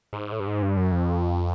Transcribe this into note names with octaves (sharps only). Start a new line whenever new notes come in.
G#2
A2
G2
G#2
G2
F#2
F2